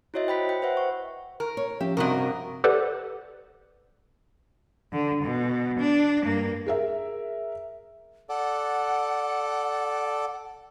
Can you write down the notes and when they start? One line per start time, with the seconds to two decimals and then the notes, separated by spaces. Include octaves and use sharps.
0.14 E4 F#4 C#5 D#5 E5
0.27 C5 G5 B5 B6
0.49 G5
0.62 B4 C5 E5 F#5
0.77 C#6
1.40 A#4
1.57 C#5
1.81 F3 C#4 G4 E5
1.97 G2 C3 C4 F#4 A#4 D#5 C#6 D#6
2.64 G4 A4 B4 C5 D5 F#5
4.92 D3
5.23 B2
5.80 D4
6.25 G2 A#3
6.66 G#4 A#4 E5
8.29 A4 D5 F#5